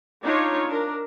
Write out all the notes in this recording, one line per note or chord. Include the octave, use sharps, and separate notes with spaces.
D4 D#4 F4 C#5
D4 A#4